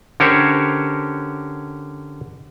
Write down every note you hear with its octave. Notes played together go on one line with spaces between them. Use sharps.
D3 C#4 G4 A#4 C5 C#5